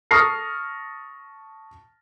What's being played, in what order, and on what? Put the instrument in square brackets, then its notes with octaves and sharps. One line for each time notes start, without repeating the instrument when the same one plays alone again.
[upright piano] A5 C#6 D#6 F6 A#6 C7